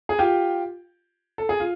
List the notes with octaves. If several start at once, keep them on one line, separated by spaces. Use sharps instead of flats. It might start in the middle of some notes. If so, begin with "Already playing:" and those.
G#4
F4 G4
A4
G#4
F4